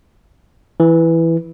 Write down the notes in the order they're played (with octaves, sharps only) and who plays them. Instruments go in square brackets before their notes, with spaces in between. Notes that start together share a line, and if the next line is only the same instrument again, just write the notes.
[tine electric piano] E3